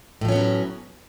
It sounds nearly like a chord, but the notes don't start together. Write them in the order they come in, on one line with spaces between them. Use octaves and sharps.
A2 F3 C#4 B3 F#3